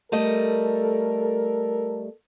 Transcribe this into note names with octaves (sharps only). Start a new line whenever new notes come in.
G3 A3 A4 A#4 D#5